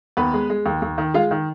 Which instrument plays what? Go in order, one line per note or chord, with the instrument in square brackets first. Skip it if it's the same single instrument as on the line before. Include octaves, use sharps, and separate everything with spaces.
[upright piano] D#2 B3 B4
G#3
G#3
D#2
D#2
D#3
G#3 F4 F5
D#3